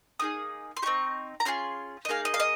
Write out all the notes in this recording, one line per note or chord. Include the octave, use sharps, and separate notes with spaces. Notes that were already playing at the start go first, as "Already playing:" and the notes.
A#3 D#4 G#4 D#6
C6
C4 D#4 G4 C#6
A#5
C#4 F4 G#4 C6
D#5
A#3 D#4 G#4 F5
D#5
F5
D#5